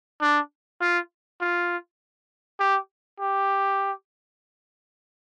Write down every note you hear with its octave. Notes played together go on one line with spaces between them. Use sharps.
D4
F4
F4
G4
G4